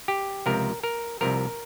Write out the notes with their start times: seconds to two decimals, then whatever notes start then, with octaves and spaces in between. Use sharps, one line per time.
0.08 G4
0.46 C#2 C3 F3 A#4
0.83 A#4
1.21 C2 C3 F3 A#4